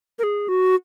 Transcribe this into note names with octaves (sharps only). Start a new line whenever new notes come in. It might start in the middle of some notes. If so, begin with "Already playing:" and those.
A#4
G#4
F#4